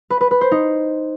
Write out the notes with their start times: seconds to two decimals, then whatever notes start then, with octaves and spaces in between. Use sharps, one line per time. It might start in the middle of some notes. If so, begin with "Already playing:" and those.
0.10 B4
0.21 B4
0.31 B4
0.41 C5
0.51 D#4